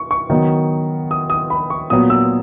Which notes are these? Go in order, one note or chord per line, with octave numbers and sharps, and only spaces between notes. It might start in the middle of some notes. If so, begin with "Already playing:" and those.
Already playing: C#6
C#6
D#3 F#3 B3
D#6
D#6
B5
C#6
A#2 F#3 B3 D#6
E6